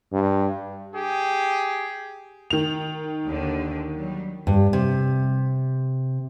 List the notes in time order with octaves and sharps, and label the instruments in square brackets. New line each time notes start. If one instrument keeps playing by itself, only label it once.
[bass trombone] G2
[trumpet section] G4 G#4
[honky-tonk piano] D#3 F7
[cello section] D#2 D3 D4
F#3 G3
[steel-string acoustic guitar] G2
C3